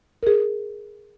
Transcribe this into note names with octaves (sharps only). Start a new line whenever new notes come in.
G#4 A#4